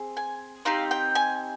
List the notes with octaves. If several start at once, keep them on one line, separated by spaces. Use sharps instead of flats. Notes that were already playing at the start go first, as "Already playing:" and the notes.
Already playing: C4 G#4
G#5
C4 D#4 G4 F5
G5
G#5